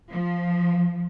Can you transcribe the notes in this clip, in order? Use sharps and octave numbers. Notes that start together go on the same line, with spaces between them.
F3